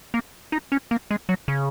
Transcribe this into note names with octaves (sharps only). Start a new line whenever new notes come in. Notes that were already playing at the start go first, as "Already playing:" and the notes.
A#3
D#4
C#4
A#3
G#3
F#3
C#3